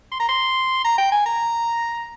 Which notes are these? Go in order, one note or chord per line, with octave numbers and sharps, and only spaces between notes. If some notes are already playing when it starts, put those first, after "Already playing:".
C6
A#5
C6
A#5
G5
G#5
A#5